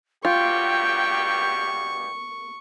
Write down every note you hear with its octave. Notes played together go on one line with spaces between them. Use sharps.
G2 B2 F4 G4 G5 C#6